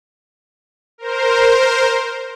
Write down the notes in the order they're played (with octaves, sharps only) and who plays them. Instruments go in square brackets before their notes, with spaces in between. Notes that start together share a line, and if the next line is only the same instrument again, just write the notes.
[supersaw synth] A#4 C5